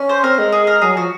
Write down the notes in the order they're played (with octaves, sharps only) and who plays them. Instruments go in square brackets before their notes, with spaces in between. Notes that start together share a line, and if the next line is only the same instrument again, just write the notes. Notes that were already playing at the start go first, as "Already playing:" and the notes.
Already playing: [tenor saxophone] C#4
[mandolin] C5
[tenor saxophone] C4 [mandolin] A#4
[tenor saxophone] G#3
[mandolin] G#4
A#4
[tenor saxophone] F#3 [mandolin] G#4
[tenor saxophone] F3 [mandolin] F#4